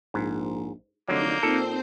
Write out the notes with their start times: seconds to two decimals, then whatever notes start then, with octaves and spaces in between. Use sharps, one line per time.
0.14 A#1 G#2
1.08 F1 D3 F#3 A#3 D#4 G6
1.43 A#2 C4 A4 C5